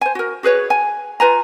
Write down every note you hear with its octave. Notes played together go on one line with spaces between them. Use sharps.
C5 G#5
F#4 A#4
F#4 G#4 B4 C#5
G#5
F4 B4 G#5 A#5